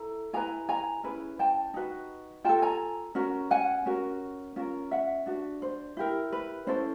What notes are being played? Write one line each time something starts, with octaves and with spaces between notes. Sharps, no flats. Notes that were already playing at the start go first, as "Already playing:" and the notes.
Already playing: E4 A4 A#5
E4 G#4 B4 G#5 A#5
G#5 A#5
C#4 E4 G#4 B4
G5 A5
D#4 F#4 B4
F4 A4 G5 A5
G#5 A#5
C#4 F#4 A#4
F#5 G#5
C#4 F#4 A#4
C#4 F4 A#4
E5 F#5
D4 F#4 B4
C5
E4 G4 A#4
B4
C#4 E4 A4 C5